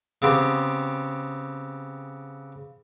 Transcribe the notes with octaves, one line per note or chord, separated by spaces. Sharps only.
C#3 B3 C4 G4 G5